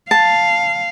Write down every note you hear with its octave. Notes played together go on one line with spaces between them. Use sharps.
F5 A5